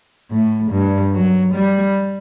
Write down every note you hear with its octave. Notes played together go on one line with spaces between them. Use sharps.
A2
G2
F#3
G3